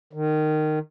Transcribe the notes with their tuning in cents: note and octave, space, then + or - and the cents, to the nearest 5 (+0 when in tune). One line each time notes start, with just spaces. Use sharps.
D#3 -20